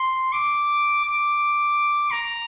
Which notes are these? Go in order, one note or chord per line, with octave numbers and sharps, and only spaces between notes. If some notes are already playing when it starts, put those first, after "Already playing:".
Already playing: C6
D6
D6
A#5